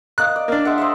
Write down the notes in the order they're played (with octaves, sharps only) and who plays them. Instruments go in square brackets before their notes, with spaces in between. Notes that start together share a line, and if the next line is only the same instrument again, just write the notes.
[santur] A#3 D#5 [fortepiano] F#6
[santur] D5
[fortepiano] A#3 D4
[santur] G#3 E5 F#5
C5 D#5 E5